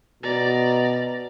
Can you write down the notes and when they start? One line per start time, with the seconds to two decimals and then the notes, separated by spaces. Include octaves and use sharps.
0.23 B2 D5 A#5